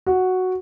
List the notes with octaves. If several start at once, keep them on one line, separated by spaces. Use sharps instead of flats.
F#4